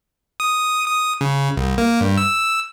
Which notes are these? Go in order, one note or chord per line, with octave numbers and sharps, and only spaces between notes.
D#6
D#6
C#3
C2
A#3
G2
E6